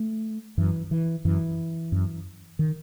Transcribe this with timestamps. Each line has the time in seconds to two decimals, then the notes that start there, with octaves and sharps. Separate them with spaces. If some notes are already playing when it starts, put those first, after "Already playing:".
Already playing: A3
0.58 F#2 E3
0.91 E3
1.25 F#2 E3
1.92 F#2
2.59 D#3